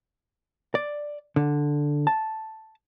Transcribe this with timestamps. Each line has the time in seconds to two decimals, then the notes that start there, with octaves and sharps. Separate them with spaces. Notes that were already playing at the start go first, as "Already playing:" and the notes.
0.75 D5
1.36 D3
2.07 A5